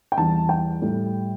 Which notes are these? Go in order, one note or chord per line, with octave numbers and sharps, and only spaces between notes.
G5
E2 E3 G3 A5
G5
A2 G3